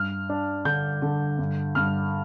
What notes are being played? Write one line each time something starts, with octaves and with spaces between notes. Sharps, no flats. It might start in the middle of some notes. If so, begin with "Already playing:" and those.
Already playing: G2 F6
D4
D3 G6
D3
G2
G2 F6